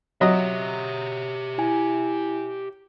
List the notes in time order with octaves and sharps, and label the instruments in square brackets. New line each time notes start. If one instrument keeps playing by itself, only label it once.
[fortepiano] F#3 D#5 [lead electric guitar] G4 E5
[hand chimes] E4 G#5